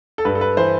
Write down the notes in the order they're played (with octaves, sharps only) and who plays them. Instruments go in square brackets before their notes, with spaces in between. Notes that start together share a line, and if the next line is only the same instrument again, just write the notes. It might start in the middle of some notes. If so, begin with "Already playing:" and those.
[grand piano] A4
G2 B4
A4
B4
E3 C5